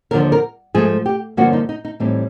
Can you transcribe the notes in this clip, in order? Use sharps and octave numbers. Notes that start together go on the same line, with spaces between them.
D#2 D3 F3 A#4
A#4
G#2 F3 A3 G#4
G4
G2 D3 F3 A#3 C#4 F#4
D#4
D#4
D#4
A2 E3 G3 C4 D#4